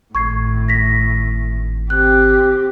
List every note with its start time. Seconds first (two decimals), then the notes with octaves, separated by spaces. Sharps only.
0.15 G#1 A2 C#6 G#6 C7
0.68 A#6 B6
1.90 C4 G4 F#6